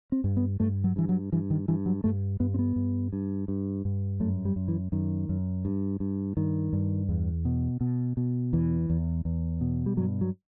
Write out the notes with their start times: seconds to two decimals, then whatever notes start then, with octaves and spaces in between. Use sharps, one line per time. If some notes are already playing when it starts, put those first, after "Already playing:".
0.12 C4
0.24 G2
0.37 B3
0.60 G2 A3
0.84 F#3
0.96 G2 E3
1.09 F#3
1.32 G2 E3
1.50 D#3
1.68 G2 E3
1.86 F#3
2.04 G2 A3
2.40 G2 B3
2.54 C4
2.59 B3
2.76 G2
3.13 G2
3.48 G2
3.85 G2
4.20 F#2 A3
4.45 G3
4.56 F#2
4.68 E3
4.92 F#2 D#3
5.29 F#2
5.65 G2
6.00 G2
6.37 G2 D#3
6.73 G2
7.09 E2
7.45 B2
7.81 B2
8.17 B2
8.53 E2 E3
8.90 E2
9.25 E2
9.61 B2
9.86 G3
9.97 G2 F#3
10.21 F#3